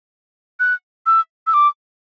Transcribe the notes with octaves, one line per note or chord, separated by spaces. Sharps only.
F#6
E6
E6
D6